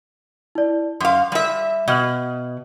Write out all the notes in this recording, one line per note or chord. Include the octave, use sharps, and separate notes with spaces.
E4 D5
F#2 F5 C6
G3 E5
B2 D#5 F6 F#7